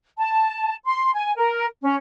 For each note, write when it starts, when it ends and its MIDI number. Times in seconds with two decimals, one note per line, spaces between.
0.18 0.75 81
0.85 1.10 84
1.13 1.32 80
1.36 1.66 70
1.82 1.95 61